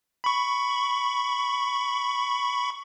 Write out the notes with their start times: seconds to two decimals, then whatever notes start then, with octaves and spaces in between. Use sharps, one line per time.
0.24 B5 C#6